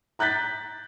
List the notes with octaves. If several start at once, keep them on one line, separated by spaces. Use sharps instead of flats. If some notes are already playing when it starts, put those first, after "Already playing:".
A#5 F#6 G6 A6 B6